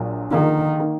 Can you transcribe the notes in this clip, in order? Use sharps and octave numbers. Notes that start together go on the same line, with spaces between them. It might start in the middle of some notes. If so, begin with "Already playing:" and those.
Already playing: A#1 A#2 F#3
D3 D#3 F3 A#3 D#4 G#4
D#3 A#3